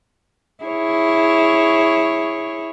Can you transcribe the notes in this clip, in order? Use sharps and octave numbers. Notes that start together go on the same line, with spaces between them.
E4 G#4 C#5